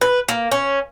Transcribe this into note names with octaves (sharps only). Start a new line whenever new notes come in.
B4
A#3
C#4